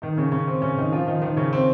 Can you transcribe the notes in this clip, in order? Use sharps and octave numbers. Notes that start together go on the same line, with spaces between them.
D#3 D#4
C#3 C#4
C#3 C#4
C4
C#3 C#4
D#3 D#4
F3 F4
D#3 D#4
D#3 D#4
C#3 C#4
C4